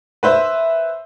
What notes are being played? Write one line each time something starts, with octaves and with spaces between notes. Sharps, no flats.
B4 C5 E5